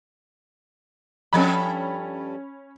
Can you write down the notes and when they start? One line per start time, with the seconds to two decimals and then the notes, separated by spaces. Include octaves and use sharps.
1.33 G2 F3 C#4 A4 B5